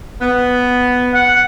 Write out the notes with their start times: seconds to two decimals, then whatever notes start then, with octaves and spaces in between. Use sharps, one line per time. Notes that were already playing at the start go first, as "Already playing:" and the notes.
0.21 B3
1.14 F#5